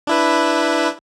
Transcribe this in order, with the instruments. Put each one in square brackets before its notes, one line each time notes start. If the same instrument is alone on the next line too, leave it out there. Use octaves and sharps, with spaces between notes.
[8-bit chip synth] D4 E4 B4